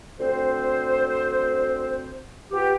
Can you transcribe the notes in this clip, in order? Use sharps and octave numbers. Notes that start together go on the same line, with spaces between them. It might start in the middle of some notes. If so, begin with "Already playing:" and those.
D2 C4 C5
B3 F4 G4